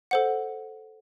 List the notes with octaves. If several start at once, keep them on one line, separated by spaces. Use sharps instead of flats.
A4 C5 F#5